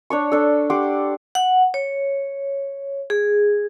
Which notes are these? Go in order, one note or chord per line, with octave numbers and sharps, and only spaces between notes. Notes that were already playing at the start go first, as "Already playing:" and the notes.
D4 C#5 C#6
D4 A4
G4 F#5 C6 D6
F#5
C#5
G#4